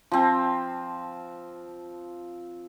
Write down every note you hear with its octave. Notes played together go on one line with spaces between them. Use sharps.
F3 C4